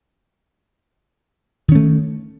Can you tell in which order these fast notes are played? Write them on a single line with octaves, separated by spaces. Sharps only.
D#3 C#4 A3